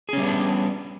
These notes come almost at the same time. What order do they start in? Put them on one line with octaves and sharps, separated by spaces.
G#4 C#4 G3 B3 D4